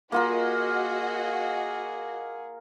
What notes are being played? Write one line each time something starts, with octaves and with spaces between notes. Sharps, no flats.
A#3 F4 F#4 G#4 A#4 D#5 F#5